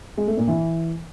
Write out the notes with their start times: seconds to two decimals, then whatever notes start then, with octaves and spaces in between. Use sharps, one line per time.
0.17 G#3
0.27 A3
0.37 A#2
0.47 E3